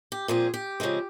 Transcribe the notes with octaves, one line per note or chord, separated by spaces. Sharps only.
G4
A#2 F3 C4 G#4
G4
C#3 F3 G#3 C4